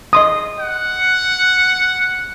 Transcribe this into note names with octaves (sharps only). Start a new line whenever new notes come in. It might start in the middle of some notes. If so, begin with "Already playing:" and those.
D#5 C6 D#6
F#5